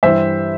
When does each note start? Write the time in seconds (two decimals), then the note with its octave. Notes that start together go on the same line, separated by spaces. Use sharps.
0.03 G2 E3 G3 C5 E5